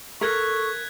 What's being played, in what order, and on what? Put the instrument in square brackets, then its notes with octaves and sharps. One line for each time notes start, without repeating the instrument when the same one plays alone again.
[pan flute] A4 [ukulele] A#4 [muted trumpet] C#6 [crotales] F#6 G#6 B6